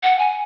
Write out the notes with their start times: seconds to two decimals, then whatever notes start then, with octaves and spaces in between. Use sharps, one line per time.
0.03 F#5
0.19 G#5